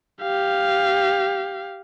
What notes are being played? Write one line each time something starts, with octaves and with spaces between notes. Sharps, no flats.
G4 F5